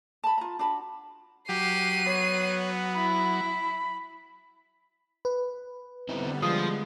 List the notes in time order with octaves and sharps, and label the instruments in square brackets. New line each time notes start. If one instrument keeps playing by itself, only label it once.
[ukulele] A5 B5
F4 A#5
D4 F#4 A5 B5
[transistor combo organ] F#3 [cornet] G4 [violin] C7 D#7
[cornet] B3 [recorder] C#5
[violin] E4 [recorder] B5
[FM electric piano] B4
[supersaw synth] D3 G3 B3 [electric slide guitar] C4 D#4 E4
[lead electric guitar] F3 [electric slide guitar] G#3 [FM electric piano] D#6